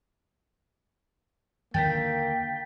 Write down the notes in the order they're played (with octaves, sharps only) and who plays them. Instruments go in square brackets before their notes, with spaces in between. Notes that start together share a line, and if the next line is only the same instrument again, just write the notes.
[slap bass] D#2 D3 D#3 [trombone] A#3 [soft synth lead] G5 [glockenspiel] A6 B6